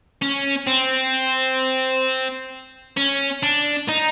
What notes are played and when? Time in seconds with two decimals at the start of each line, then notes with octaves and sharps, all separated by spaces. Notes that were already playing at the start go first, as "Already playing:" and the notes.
0.22 C#4
0.67 C4
2.97 C#4
3.43 D4
3.89 D#4